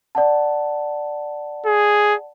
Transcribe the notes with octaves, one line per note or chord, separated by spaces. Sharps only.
D5 F#5 A5
G#4